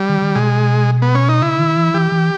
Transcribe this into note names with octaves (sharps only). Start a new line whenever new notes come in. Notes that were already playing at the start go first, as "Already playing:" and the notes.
Already playing: G3
D#3
D#3
B2 G#3
B3
C#4
D#4
C#3 E4
D#3
E3
E3 G4
E3